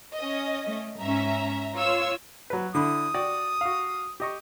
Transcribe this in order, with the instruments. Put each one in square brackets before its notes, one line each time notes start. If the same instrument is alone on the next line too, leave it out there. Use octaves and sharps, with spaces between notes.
[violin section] C#4 D#5
[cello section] A3
[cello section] G#2 C#4 [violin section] E5 A#5
[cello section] F4 [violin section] C#5 E6
[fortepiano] F#3 B4
[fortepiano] D3 D4 E4 [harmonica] D#6
[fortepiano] F#4 D5 G5
F#4 F5
G4 D#5 C#6